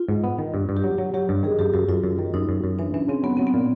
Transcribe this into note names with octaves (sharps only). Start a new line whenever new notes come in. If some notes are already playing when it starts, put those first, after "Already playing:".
Already playing: F4
G#2
B3
D#3
G2
G2
G4
F#3
F#3
F#3 G4
G2
D#3 G#4
F#2 G4
F#2 F#4
F#2 F4
F#2
D#3
F#2 D#4
F#2
F#2
E3 D4
E3 C#4
C#3 C4
F#3 B3
F#3 C4
B3
A#2